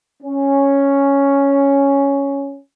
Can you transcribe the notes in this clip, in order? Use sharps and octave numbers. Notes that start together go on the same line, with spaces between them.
C#4